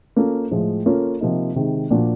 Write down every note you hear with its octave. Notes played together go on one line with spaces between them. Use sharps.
A#3 C#4 F4 A4
A2 F3 G#3
A#3 C#4 F4 A4 C#5
C3 F3 A#3 D#4
C3 D#3 G#3
A#2 F3 A#3 D4 F#4